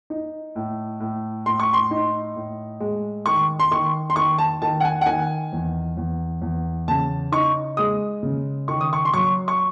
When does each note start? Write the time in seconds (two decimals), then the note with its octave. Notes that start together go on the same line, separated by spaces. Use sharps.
0.10 D#4
0.56 A2
1.00 A2
1.46 A2 C6
1.60 C#6
1.73 C6
1.91 D#4
2.36 A2
2.80 G#3
3.26 D#3 C#6
3.60 C6
3.71 D#3 C#6
4.10 C6
4.16 D#3 C#6
4.38 A5
4.62 D#3 A5
4.80 F#5
4.85 G#5
5.01 F#5
5.06 D#3 G#5
5.53 E2
5.97 E2
6.42 E2
6.88 C#3 A5
7.32 D#4 C#6
7.77 G#3 D#6
8.23 C#3
8.68 D#3 C#6
8.81 D#6
8.93 C#6
9.05 C6
9.13 F#3 C#6
9.48 C#6